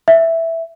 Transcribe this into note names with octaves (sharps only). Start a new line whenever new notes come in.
E5